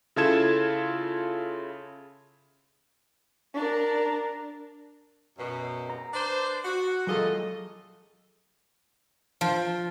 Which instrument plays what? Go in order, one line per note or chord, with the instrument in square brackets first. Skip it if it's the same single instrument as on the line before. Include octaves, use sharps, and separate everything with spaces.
[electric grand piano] C#3 E4 F4 A4 G#6 E7
[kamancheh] D4 A#4
[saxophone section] F#2 B2
[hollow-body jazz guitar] A#5
[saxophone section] D4 B4 C5
F#4
[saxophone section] A#2 F4 D#5 [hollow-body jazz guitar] F#3 G#4 A4
[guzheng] F3